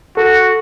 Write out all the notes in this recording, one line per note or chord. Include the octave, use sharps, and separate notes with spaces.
F#4 A4